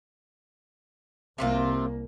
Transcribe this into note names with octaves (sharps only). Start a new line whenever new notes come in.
C2 C3 A#3 C4 F4